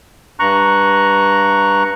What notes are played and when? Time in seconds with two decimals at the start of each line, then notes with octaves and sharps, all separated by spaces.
0.40 G2 A#5 C#6 F#6